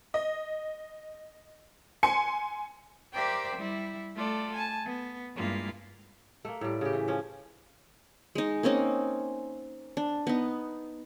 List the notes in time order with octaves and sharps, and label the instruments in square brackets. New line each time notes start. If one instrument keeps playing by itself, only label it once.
[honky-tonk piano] D#5
G#5 C6 C#7
[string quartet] G4 A#4 C5 D5 E5 G5
G3 E4
A3 F4 A4 D5
G#5 A5
B3
G2 G#3 A#3 E4 F4
[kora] A3 A#3
A2 G3
C#3 G4
E3
F3 C#4
[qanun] G#3 D#4
A#3 C4 C#4 D#4
D4
B3 D#4